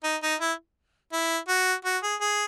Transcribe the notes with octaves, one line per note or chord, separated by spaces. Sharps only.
D#4
D#4
E4
E4
F#4
F#4
G#4
G#4